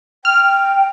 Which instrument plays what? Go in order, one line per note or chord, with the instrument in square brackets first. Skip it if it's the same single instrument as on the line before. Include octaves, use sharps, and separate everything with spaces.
[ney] G5 [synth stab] F6